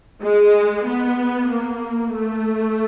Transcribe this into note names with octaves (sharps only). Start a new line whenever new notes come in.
G#3
B3
A#3
A3